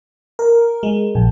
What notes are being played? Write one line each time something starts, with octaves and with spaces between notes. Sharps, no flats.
A#4
G#3
A#1